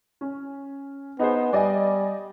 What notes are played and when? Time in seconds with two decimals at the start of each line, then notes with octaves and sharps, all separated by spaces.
0.21 C#4
1.19 B3 D#4 G#4 C5
1.53 G3 D5 D#5 G#5